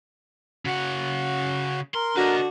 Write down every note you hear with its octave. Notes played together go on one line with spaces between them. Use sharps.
C#3 F#4 F#5
A#4 C6
D3 D4 F#4 B4 D#5